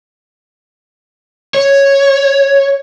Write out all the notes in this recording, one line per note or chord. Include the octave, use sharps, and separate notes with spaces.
C#5